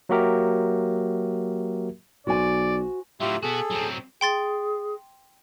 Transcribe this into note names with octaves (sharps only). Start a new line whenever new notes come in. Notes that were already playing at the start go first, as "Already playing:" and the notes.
F#3 A#3 F#4 G4 A#4 E5
B1 F#4 C5 D5 G#5
A2 F#3 F4 G4 E5
B3 F#4 G#4 A4
F#3 C4
G#4 G5 C6 A6